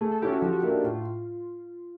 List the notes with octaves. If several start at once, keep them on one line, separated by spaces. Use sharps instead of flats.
A3 G#4
A4
C#4 E4 G4 A4
F#4
F3 F#4
F#4
A#3 D4 E4
D#4
A2 F4
F4